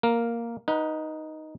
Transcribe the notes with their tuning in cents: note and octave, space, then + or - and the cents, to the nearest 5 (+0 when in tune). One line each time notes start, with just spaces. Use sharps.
A#3 +0 A#4 +0
D#4 +0 B4 -30 F#5 +0